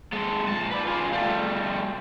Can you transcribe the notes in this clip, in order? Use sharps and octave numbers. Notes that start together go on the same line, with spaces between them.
G#3 A4
A#2 A5
B4 D5
F4 G#4
G3 A3